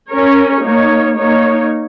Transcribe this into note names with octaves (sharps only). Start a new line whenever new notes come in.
C#4 A#4 C#5
A#3 D#4 C#5
A#3 D#4 C#5